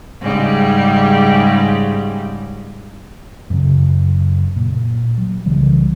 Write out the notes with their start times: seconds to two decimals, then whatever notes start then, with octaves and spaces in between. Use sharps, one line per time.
0.21 G#2 C#3 G3
3.50 F#2 C#3
4.56 A#2
5.18 F#3
5.46 C2 C#3 E3 G3